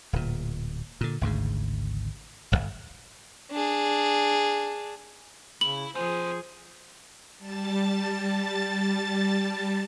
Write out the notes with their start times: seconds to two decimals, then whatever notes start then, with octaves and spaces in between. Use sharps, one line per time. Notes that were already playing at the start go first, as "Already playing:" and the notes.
0.13 D1 A#2
1.01 A#2 D3
1.21 G#1 D2 G#2 C#3
2.52 D1 G1
3.51 D4 G#4
5.61 C#3 E4 F#7
5.95 F3 C4 G#4 C5 G#5
7.38 G3 A5 A6